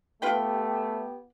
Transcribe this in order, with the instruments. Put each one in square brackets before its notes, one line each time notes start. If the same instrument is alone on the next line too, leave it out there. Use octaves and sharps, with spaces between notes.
[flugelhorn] A3 [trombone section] B3 G4 [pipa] F4 B4 G5